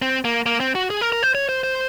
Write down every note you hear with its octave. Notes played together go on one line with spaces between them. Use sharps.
C4
A#3
A#3
C4
F#4
G#4
A#4
A#4
C5
C#5
C5
C5